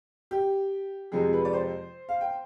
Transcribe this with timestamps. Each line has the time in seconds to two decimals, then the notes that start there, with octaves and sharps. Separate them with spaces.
0.31 G4
1.12 F2 C3 F3 G#3 G#4
1.33 B4
1.45 D5
1.53 C5
2.09 F5
2.21 G5